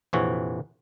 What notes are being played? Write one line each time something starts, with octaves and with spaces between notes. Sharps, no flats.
A#1 F2 C3 E3 F#4 C#5